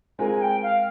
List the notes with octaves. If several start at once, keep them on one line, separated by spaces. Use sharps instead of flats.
G#3 C4 F4 A#4 G#5
G#5
G5
F5